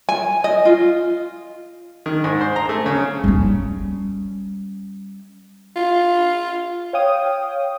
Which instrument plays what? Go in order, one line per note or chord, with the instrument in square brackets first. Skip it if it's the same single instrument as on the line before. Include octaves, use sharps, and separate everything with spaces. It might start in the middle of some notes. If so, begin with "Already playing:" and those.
[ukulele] G#5
D#5
F4
[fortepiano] D#3
G#2
C5
A#5
A3
C#3
[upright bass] G3 C#4
[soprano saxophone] F4
[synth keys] C#5 F5 G5 D#6